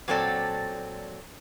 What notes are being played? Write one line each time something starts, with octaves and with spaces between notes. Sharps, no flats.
A#2 F#3 C4 A4 D5